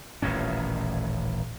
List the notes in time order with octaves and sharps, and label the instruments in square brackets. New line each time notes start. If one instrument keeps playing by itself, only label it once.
[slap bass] D#1 A1 A2 C#4